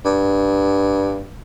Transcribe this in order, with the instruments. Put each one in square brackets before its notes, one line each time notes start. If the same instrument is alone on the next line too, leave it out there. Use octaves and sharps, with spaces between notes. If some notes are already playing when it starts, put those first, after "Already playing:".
[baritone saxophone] G2